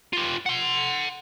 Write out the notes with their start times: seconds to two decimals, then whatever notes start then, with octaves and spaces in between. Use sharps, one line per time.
0.13 F4 G4
0.46 F#5 C6